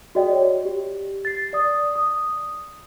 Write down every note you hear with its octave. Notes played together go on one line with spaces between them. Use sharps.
F#4 G#4 D5 D#5 G5
C#5
G4
A6 C7
D5 D#6
D#6